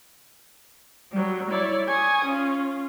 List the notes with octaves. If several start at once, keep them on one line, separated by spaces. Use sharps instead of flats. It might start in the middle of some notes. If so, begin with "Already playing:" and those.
F#3 G3
E4 C#5 D5
G#5 C#6 D#6
C#4 F4